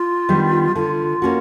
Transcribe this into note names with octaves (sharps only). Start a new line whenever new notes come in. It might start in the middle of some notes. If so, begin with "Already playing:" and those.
Already playing: F4
D#3 G3 B3 D4
D3 F4
A#3 C#4 F#4